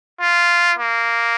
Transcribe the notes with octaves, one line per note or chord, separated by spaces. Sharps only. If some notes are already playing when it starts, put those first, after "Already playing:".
F4
A#3